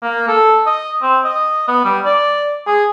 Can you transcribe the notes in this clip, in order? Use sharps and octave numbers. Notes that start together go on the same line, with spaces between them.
A#3
A4
D#5
C4
D#5
B3
G3
D5
G#4